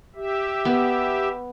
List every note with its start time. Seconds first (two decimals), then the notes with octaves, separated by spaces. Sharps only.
0.16 G4 E5
0.65 B3